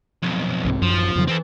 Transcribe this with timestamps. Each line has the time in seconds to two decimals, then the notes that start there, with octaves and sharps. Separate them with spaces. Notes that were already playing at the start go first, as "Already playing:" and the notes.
0.23 B1 F2
0.65 C2 G#2 C4
0.82 A1 F#2 F3
1.15 F2 C#3 F#3
1.28 E3 C4 A4